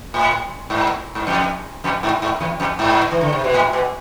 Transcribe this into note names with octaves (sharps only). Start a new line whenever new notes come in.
A2
G#2
G#2
F2
F2
G#2
G#2
E2
F2
G#2
E3
D3
C3
B2
A2
B2